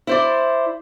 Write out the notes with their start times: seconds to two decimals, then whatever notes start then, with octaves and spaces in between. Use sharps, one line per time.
0.07 E4 C5 D5